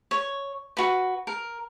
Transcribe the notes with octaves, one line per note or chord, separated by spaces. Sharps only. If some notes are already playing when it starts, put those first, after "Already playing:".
C#5
F#4 B4
A#4